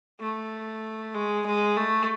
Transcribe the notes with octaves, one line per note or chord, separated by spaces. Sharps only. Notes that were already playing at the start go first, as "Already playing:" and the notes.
A3
G#3
G#3
A3